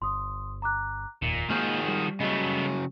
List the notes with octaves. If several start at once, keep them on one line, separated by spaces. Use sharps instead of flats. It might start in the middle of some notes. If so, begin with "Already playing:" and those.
G1 C6 D#6
A#5 D6 F#6
F1 D#2 A#2 C#7
D#3 F3 G#3 A#3 F#4 G#4 F6 G6
G3
C#3 F#3 A3 B3 D#5